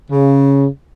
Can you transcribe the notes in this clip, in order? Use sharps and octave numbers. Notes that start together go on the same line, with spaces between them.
C#3